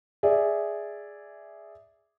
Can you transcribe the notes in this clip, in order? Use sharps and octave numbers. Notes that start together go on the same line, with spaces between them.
G#4 D5 E5